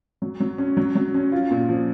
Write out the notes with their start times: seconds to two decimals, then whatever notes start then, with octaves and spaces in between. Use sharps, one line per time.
0.22 F#3
0.40 F#3
0.58 C#4
0.77 F#3
0.95 F#3
1.14 C#4
1.32 F4
1.51 A#2
1.69 F3